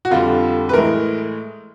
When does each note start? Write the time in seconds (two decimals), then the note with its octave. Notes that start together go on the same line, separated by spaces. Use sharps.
0.05 F#4
0.11 F2 D3 G3 F4
0.69 B4
0.73 A2 E3 G#3 A#4